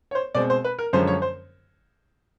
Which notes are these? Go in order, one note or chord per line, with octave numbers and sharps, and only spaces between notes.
C#5
C5
B2 G#3 C4 D5
C5
B4
A#4
F#2 D3 F3 G#3 C#4 C5
C#5
C5